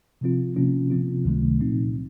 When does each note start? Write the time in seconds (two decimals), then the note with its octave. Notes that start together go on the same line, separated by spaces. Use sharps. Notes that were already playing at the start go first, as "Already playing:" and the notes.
0.21 C3 F3 C4 F4
0.56 C3 F3 A#3 C#4 F4
0.91 C3 F3 C4 F4
1.25 C#2 C3 D#3 F#3 A3
1.60 A#2 F3 C4 D#4